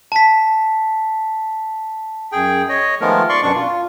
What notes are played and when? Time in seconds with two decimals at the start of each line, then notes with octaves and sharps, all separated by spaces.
0.12 A5 B6
2.32 F#2 G#4 G5
2.69 C#5 D#5
3.01 D#3 F3 G#3 A3 B3 A#4
3.29 D5 C6 C#6
3.43 F#2 B2 D4 C#6
3.55 F4